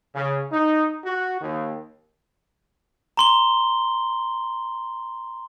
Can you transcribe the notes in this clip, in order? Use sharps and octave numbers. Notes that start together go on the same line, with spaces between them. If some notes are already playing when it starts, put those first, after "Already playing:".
C#3
D#4
F#4
D#2
A#5 C6 G7